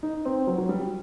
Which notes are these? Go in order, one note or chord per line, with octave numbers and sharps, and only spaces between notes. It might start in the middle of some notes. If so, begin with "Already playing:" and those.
D#4
C4
F#3
F#3
G3